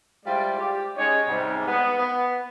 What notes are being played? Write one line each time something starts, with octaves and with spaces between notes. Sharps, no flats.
G3 G#3 E4 F4 C5 D5
G4
G#3 C#4 D#4 C#5
G#2 C3 G3
B3
B3